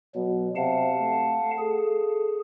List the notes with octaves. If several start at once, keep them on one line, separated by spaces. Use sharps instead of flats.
B2 F#3
C3 F5 F#5 A5
A3
G#4 A4